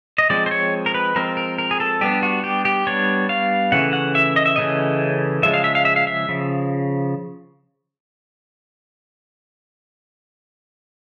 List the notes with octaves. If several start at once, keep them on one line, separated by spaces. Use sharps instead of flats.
D#5
F3 G#3 C4 D5
C5
C#5
A#4
B4
F3 G#3 C4 A#4
A#4
A#4
G#4
A4
G3 B3 D4 G4
F#4
G4
G4
G3 B3 D4 C#5
F5
C#3 E3 A3 C#4 F#5
F#5
E5
D#5
E5
C#3 E3 A3 C#4 D#5
C#3 F3 G#3 E5
F5
E5
F5
E5
F5
E5
C#3 F3